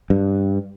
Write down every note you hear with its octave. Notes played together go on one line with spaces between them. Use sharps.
G2